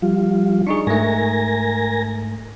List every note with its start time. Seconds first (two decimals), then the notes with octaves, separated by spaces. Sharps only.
0.02 F3 G3 F4
0.67 D4 D#4 G#4 C#6
0.87 G#2 A3 A#4 G#5 A#6